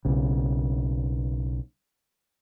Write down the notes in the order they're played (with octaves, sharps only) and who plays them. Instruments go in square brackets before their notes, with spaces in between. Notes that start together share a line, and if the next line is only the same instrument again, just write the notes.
[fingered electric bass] B1 C#3